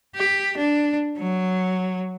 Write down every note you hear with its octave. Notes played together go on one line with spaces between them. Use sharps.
G4
D4
F#3